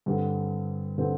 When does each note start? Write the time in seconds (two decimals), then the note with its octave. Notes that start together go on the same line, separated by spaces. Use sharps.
0.06 G2 D3 G3 C4
0.98 D3 G3 C4